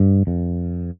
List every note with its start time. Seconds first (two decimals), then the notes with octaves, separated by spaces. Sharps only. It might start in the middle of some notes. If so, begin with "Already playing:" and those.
Already playing: G2
0.27 F2